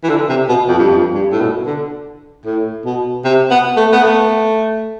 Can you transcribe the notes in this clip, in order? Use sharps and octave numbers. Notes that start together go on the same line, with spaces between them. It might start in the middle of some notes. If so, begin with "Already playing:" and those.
E3
D3
C3
B2
F2
G2
F2
G2
A2
B2
D3
A2
B2
C3
B3
A3
B3
A3